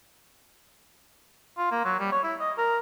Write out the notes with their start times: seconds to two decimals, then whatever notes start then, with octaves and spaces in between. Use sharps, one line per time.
1.58 F4
1.71 A#3
1.84 F#3
1.99 G3
2.12 C#5
2.24 E4
2.40 D#5
2.57 A#4